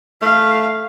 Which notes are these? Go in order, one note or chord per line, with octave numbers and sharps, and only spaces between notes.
A3 F5